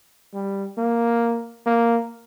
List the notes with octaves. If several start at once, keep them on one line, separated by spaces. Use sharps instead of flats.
G3
A#3
A#3